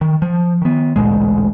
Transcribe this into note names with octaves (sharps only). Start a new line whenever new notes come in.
D#3
F3
D#3 B3
A1 D2 A#2 G#3